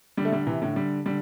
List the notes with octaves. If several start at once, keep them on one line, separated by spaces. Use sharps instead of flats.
D3 G3
A3
D3 G3
C3 E3
A2 D3
D3 G3
D3 G3